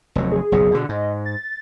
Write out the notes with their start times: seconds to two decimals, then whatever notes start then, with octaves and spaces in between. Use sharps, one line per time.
0.15 F1 D#2 F#3
0.32 G#4
0.52 F#1 B1 A#2
0.71 B2 D3
0.89 G#2 D#5
1.26 A6